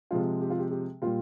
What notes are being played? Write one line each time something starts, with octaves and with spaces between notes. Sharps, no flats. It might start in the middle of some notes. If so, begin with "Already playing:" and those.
C3 F3 G#3 F4
G4
F4
G4
G4
A#2 G3 F4